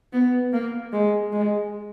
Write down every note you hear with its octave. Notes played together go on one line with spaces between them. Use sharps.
B3
A#3
G#3
G#3